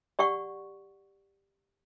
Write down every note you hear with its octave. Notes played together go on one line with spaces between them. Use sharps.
G4 D5 F#5 C#6